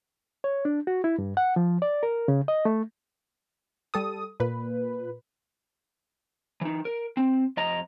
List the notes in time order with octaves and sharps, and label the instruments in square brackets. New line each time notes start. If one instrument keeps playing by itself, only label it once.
[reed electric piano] C#5
D4
F#4
E4
G2
F#5
F3
D5
A#4
C#3
D#5
A3
[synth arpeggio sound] G3 A4 D#6
A#2 B4
[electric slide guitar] E3 D#4
A#4
C4
F2 D#5 A#5